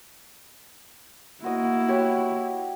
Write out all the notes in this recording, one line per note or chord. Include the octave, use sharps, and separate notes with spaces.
A#3 E4 F#4 D#5
F#4 G4 C#5